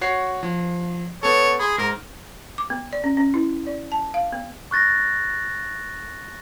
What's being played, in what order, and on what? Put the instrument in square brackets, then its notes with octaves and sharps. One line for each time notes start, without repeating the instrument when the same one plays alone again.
[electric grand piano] F#4 C#5 C7
F3
[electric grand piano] B3 A4 [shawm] C#5
[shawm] G#4 [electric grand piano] B5 C6
[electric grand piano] G#2 [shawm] A#4
[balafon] D6
B3
D5
C#4
C#4
E4
D5
A5
F5
B3
[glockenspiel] C#6 F#6 A6 A#6